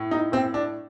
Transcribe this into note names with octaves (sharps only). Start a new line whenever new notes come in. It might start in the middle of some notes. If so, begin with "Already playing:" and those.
Already playing: A2
D#4
A2 C4
D4